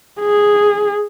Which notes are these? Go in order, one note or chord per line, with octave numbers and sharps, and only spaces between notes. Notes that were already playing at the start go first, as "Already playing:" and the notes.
G#4